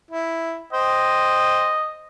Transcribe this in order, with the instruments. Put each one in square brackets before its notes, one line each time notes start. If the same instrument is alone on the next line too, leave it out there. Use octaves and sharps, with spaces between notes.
[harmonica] E4
[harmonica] C5 G5 [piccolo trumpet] D#5